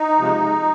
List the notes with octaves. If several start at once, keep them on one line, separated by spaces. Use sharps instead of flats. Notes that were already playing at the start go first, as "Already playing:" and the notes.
Already playing: D#4
C3 F3 G#3